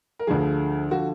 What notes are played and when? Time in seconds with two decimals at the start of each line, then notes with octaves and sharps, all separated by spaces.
0.19 A#4
0.27 D2 D3 F3 G#4
0.91 D3 F3 F#4